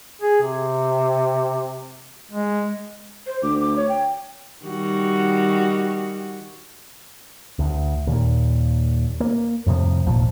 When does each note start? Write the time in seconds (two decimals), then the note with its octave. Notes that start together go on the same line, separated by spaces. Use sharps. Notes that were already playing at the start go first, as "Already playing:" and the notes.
0.21 G#4
0.42 C3
2.31 G#3
3.27 C5
3.42 D2 D6
3.60 D6
3.76 C#5
3.89 G5
4.65 D#3 G3 F#4
7.59 D2
8.07 D#2 A#2
9.20 A#3
9.66 F2 A2 C3 F3
10.06 G#1 D#2 A#2 F3